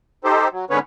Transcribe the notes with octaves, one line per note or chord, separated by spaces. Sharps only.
D#4 G4 A4 C5
F#3
G#2 D3 B3 C#4 B4 C#5